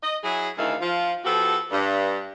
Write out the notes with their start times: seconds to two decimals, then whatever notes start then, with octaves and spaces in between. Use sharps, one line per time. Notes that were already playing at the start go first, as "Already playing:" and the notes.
0.03 D#5
0.23 F#3 E4 G#4
0.58 D2 D#3 E4 G#4 F5
0.80 F3 F4
1.25 F3 B3 F#4 G4 A4
1.71 G2